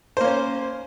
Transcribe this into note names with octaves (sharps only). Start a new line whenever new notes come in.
A#3 C#4 C5